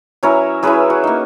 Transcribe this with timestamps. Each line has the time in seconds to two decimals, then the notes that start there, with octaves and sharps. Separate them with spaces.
0.23 F#3 C#4 E4 A#4 C#5
0.63 F#3 C#4 E4 G#4 B4
0.90 F#4
1.04 A#3 D#4